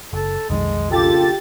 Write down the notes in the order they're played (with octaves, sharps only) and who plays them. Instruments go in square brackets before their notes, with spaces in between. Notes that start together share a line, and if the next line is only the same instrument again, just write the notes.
[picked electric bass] F#1 [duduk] A4
[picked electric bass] B1 F2 D#3 [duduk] G#3
[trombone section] A#1 C#3 F4 [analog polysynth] G4 A6 [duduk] A4